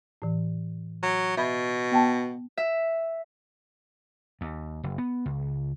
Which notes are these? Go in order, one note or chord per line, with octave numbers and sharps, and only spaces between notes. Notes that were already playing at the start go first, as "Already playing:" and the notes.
A2 E3
F#3
B2 E5 B5
B3 G5 A5
E5
D#2
F#1
B3
C#2